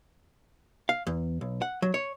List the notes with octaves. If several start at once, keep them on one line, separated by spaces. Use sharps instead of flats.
F5
E2
B1
F#5
F#3
C#5